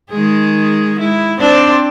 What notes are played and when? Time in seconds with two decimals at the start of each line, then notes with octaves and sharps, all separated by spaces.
0.10 D#3 G#3 G#4
1.00 G#3 E4
1.39 C4 D4 D5